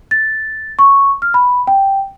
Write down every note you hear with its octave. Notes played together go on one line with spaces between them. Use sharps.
A6
C#6
F6
B5
G5